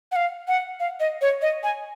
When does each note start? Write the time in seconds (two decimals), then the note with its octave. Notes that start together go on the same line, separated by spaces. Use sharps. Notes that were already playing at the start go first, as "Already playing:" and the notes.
0.12 F#5
0.16 F5
0.48 F#5
0.80 F5
1.00 D#5
1.22 C#5
1.42 D#5
1.63 G#5